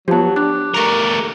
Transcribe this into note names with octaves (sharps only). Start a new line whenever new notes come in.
F3 F#3 B3 G4 A5
D4 G4 F#6
A3 A#4 A#5 C#6